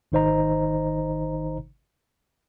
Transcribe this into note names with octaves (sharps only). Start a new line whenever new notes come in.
G#1 D#3 D#4 C5 D#5 A#5